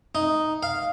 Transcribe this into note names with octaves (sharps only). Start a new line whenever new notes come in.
D#4
F5